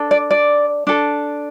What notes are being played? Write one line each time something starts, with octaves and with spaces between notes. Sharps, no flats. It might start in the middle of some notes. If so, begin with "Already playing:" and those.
Already playing: D4 A4
D5
D5
D4 A4